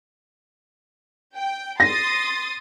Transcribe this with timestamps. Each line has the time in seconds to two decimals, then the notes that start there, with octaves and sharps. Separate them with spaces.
1.35 G5
1.80 C6 D#6 A6 A#6